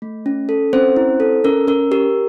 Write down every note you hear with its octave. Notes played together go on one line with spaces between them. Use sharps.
A3
C#4
A4
C4 C#4 C5
E4
A4
C#4 A#4
C#4 A#4
G4 A#4